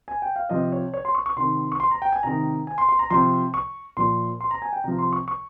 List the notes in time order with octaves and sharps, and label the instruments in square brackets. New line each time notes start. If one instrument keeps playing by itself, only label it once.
[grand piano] G#5
G5
F5
C3 F3 D#5
C#5
C#5
C6
C#6
C#6
C3 D#3 C6
C#6
C6
A#5
G5
G#5
C3 D#3 A#5
G#5
C6
C6
A#5
C3 F3 C6
C#6
A#2 F3 C6
C6
A#5
G#5
G5
C3 F3 A#5
C6
C#6
C#6